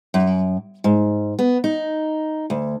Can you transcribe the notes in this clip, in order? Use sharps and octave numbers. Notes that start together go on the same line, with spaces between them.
F#2
G#2
B3
D#4
D2